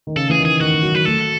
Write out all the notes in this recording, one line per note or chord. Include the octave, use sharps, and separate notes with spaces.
D#3
C#3 A4
E3 G#4
D#3
G#4
D#3 F#4
D#3
F#3
F#3 B4
A3 A4